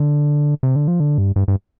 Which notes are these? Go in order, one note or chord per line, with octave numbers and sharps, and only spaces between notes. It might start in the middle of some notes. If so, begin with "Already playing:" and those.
Already playing: D3
C3
D3
F3
D3
G2
G2
G2